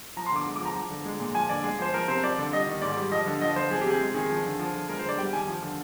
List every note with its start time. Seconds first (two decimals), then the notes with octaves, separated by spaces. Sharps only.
0.16 F3 A#5
0.26 C6
0.31 D3 D6
0.46 G#3
0.56 D6
0.61 F3 A#5
0.76 F3
0.90 D3
1.05 G#3
1.20 A#2
1.35 F3 G#5
1.50 D3 D5
1.64 G#3 G#4
1.79 F3 C5
1.94 F3 A#4
2.08 C3 C5
2.24 F3 D5
2.38 D3
2.52 G3 D#5
2.67 D#3
2.82 G#2 D5
2.97 G3
3.11 F3 D#5
3.26 D3
3.41 F3 D#5
3.56 D3 C5
3.71 F3 G#4
3.81 G4
3.86 C3 G#4
4.00 G#3
4.15 D#3 G#4
4.30 F3
4.45 D3
4.59 F3
4.74 D3
4.89 G#3 A#4
4.99 C5
5.04 D3
5.09 D5
5.18 G3 G5
5.33 D#3 G#5
5.48 F3
5.63 D3